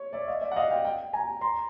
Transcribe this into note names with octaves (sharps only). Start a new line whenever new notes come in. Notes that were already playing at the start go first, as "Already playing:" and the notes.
Already playing: C#5
D5 E5
D#5 F5
D5 E5
F#5
D#5 F5
F5 G5
F5 G5
G#5 A#5
A#5 C6